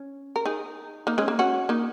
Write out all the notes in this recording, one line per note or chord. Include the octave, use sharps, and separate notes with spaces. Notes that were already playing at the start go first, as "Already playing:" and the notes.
Already playing: C#4
A#4
D#4 G#4
A#3 D#4
G#3 C#4
A#3
C#4 F#4
A#3 D#4